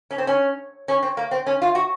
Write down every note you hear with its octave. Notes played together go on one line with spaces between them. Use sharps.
C#4
C4
C#4
C#4
C4
A#3
C4
C#4
F4
F#4